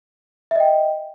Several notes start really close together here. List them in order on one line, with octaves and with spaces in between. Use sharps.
E5 D#5 G5